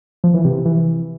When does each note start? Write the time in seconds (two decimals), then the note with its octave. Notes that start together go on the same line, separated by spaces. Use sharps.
0.24 F3
0.34 E3
0.45 C3
0.55 C3
0.65 E3